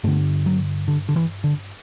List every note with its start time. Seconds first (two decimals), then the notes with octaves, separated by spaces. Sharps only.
0.04 G2 D3 A3
0.46 F#3
0.88 D3
1.09 D3
1.16 E3
1.44 D3